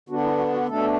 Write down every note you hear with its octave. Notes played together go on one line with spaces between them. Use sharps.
D3 B3 D4 F#4
E4
F#4
F#4
B2 A3 D4 A4